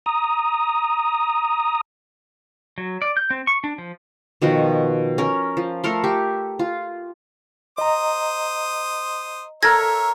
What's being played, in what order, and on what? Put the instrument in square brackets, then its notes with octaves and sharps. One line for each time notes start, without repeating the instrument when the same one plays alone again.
[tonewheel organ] A#5 D#6
[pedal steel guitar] F#3
D5
G6
C4
C#6
D4
F3
[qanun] B2 D#3 F3 F#4
C#4 A#4
F3
A3 A4 A#4 C6
G4 E5
F4
[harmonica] C5 D#6 [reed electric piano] D#5 A#5
[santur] A4 A#4 [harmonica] C#5 E5 [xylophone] G#6 A#6